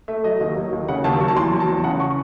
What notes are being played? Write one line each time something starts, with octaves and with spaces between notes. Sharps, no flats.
A3 E5
F#3 D#5
D#2
F#3
D#2
C#3 F#5
D#2 A5
F#3 C#6
A5
E2 C6
F#3
A5
E2
C#3 F#5
C#6